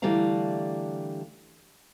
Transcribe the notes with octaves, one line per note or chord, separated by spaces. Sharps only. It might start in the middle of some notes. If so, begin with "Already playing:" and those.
D3 E3 G3 A3 F5 A#5